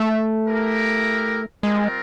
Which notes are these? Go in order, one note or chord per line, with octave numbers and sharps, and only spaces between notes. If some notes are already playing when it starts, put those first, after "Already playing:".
Already playing: A3 E5
E4 G4 A#4
G3 G#3 C4 F4 A#4